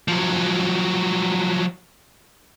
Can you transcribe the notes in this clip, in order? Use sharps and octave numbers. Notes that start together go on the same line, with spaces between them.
F3 F#3